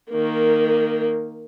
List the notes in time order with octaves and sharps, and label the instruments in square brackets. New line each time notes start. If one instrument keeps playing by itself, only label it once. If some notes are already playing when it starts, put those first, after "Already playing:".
[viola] D#3 A#3